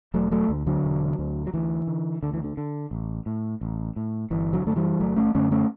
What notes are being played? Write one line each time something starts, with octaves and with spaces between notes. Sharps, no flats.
E1 F#3 A3
F#3 A3
D2 D3
D3 F#3
E1
D2 D3
F#3
D2 E3
D3
D2 D3
E3
D3
D3
A1
A2
A1
A2
G1 E3
D3 F#3
F#2 D3 A3
E3 G3
G1 F#3 A3
A3 C#4
F#2 D3 A3 C#4
A3 C#4